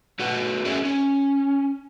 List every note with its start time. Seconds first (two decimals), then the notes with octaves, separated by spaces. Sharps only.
0.19 A3 F#4 B4 F#5
0.65 C#4 G#4 A#4 E5
0.85 C#4